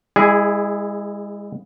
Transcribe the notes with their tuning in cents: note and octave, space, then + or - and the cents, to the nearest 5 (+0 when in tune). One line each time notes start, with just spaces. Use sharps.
G#3 -35 E4 +0 G#4 +0